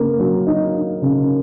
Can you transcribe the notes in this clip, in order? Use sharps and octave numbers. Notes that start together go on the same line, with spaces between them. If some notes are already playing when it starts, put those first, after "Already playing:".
Already playing: C#3 A#3
F#3
D#4
D#4
C#3